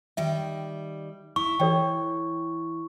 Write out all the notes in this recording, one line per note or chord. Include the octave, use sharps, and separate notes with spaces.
D#3 G3 E5 G5
E4 C#6
E3 A4 C#5 G5